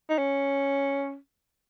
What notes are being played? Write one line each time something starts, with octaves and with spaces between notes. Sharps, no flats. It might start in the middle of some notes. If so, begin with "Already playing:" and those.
D#4
C#4